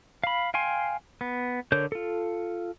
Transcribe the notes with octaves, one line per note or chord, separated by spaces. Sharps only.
F5 B5
F5 G5 G#5 C6
B3
D3 A#4 C#5 G6
F4 A4